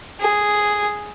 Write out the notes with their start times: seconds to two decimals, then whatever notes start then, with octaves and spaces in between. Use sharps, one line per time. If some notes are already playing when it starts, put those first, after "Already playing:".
0.21 G#4